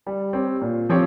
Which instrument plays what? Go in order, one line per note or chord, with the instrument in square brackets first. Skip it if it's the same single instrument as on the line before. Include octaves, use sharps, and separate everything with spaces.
[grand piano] G3
C4 G4 C#5
A#2
F3 C4 G4 C#5